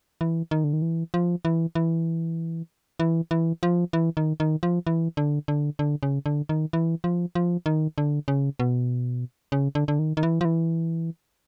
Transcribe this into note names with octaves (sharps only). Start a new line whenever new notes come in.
E3
D#3
D3
D#3
E3
F3
E3
E3
E3
E3
F3
E3
D#3
D#3
F3
E3
D3
D3
D3
C#3
D3
D#3
E3
F3
F3
D#3
D3
C#3
B2
C#3
D3
D3
D#3
D#3
E3
F3
E3